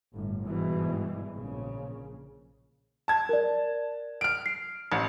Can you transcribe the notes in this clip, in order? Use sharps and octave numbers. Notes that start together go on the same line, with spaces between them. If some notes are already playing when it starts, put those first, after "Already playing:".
G1 A2
G#2 B2 E3 G3 G#3
A#1 C#3
A5 G#6
A#4 D5
F6 D7
C7
A1